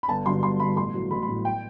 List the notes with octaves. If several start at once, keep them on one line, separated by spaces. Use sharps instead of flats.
B5
G1 A5
G2 D3 F#3 C6
G1 C6
G2 D3 F#3 B5
A1 C6
A2 F#3
A1 B5
B5
A2 F#3
G5